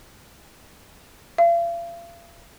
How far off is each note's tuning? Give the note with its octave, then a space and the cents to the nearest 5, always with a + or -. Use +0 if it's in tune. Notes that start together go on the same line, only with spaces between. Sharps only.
F5 -40